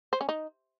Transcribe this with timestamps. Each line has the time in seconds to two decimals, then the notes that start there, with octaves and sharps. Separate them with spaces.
0.13 C5
0.21 C#4
0.29 D#4